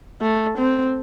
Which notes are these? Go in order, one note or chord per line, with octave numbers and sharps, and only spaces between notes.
A3
C4